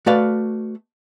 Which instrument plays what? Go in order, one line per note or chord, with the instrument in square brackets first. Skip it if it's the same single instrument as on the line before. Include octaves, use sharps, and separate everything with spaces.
[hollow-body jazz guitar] A3 F#4 B4 D5 F5